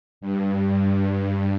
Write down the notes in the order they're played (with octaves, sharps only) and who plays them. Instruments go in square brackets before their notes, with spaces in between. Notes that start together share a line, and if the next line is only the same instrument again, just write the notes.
[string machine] G2